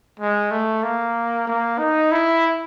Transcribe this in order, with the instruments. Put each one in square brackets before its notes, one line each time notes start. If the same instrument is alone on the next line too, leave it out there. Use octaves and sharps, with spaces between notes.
[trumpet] G#3
A3
A#3
A#3
D#4
E4